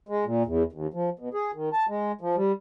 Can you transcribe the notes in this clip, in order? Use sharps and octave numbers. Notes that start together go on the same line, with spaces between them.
G#3
A#2
E2
D#2
F3
B2
G#4
D#3
A5
G#3
F3
G3